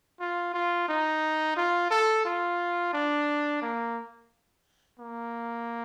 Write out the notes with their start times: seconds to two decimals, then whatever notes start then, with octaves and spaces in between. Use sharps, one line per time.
0.20 F4
0.54 F4
0.88 D#4
1.57 F4
1.91 A4
2.25 F4
2.93 D4
3.62 A#3
4.99 A#3